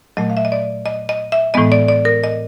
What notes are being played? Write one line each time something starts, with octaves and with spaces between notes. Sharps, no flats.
A#2 F#3 A3 D#5
F5
E5
D#5
D5
D#5
D#5
E5
A2 E3 G#3 B3 D#5
D5
D5
A#4
D#5